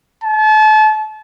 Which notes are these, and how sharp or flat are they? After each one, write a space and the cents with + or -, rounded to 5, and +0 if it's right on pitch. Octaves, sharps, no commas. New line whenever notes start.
A5 -35